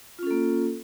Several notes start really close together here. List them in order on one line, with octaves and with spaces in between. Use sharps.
F4 C#4 A4 A#3